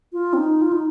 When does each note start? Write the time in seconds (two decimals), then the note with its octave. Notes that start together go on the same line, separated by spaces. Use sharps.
0.13 F4
0.33 C4
0.37 D#4
0.62 F4
0.73 D#4